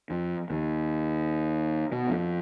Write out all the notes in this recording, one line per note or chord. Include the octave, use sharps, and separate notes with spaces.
F2
D#2
B2
F2